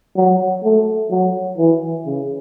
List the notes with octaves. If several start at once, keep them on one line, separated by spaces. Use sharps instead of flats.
F#3
A3
F#3
E3
C#3